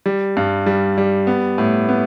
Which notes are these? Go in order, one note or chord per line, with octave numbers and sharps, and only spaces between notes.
G3
G2
G3
G3
B3
A2
B3